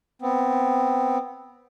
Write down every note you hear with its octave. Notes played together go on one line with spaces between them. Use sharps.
B3 C4